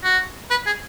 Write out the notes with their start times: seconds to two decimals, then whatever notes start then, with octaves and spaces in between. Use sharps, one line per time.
0.04 F#4
0.50 B4
0.66 G#4